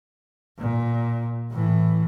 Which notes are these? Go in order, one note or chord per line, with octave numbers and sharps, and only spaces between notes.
A#2
A2 E3